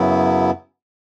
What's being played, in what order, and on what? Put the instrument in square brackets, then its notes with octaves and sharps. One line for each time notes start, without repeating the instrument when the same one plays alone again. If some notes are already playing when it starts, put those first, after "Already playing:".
Already playing: [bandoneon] F#2 C#3 F#3 B3 E4